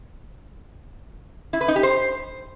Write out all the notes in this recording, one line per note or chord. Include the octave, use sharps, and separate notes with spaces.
E4
B4
D#4
G4
C5